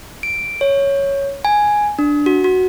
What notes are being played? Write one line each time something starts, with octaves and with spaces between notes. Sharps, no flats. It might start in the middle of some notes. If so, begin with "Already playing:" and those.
D7
C#5
G#5
D4
F#4
F#4